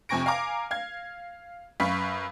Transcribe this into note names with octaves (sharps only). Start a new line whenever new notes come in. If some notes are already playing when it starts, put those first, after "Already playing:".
F2 C3 G#5 C#6 A#6 D7
F5 G#5 A#5 D6
F5 G#6
F#2 B4 F5 B5 C#6 B6